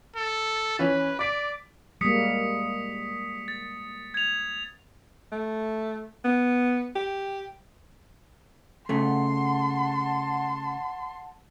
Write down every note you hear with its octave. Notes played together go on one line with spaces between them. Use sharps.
A4
E3 C#4 B4
D5 D6 B6 D7
G3 G#3 A#3 D#6 B6 C#7
A6
G#6 F7
A3
B3
G4
C#3 A3 F#5 A5 C6